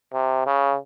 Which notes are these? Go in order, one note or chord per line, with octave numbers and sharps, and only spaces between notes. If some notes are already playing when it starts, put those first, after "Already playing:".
C3
C#3